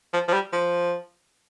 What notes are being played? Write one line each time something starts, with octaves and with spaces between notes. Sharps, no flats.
F3
F3
G3
F3